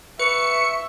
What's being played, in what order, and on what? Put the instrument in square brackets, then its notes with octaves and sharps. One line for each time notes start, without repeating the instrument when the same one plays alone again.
[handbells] B4 [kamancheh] E5 [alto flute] C#6 [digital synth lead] C#7